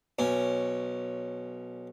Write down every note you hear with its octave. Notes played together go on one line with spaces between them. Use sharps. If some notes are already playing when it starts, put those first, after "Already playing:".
B1 C#4